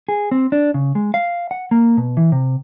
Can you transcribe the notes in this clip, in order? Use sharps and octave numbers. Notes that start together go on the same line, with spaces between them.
G#4
C4
D4
C#3
G#3
F5
F#5
A#3
B2
E3
C3